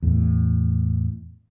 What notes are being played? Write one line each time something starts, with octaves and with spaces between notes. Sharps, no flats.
E2 A2